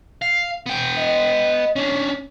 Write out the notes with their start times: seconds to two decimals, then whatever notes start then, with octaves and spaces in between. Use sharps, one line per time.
0.22 F5
0.66 B3 G5
0.98 D#5
1.76 C#4 D4 C#5